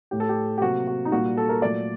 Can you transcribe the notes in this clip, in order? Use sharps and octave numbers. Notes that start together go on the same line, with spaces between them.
A2 A3 G4
A4
G4
G4
C3 F#3 A#3 F#4
F#4
D#4
A#2 G3 A#3 F#4
A4
A#4
A#2 F#3 A3 D5